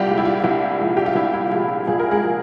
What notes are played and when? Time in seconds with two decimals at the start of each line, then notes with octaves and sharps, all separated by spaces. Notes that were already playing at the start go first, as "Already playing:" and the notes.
Already playing: C2 G3 F4 G4
0.08 A#2 F3 G#3
0.18 E4
0.25 F4
0.44 C2 E4
0.79 A#2 F3 G#3
0.97 G4
1.06 F4
1.15 C2 E4
1.33 E4
1.52 A#2 F3 G#3 F4
1.87 C2 G#4
2.00 A#4
2.11 G#3 G#4
2.23 A#2 F3 G#3